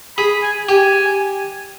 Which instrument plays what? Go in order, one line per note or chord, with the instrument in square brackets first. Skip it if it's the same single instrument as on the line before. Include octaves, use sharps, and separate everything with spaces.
[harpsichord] G#4 [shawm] B5
[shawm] G#5
[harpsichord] G4 [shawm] G#5